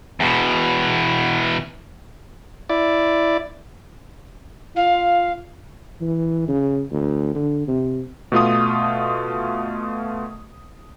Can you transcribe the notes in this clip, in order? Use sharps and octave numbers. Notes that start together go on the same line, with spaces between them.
E2 B2
E4 D5
F4 F5
E3
C#3
D2
D3
C3
B2 A3 F4 D#6